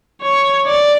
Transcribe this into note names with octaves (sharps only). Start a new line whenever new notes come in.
C#5
D5